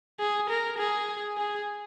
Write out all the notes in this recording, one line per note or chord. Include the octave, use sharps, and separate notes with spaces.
G#4
A#4
G#4
G#4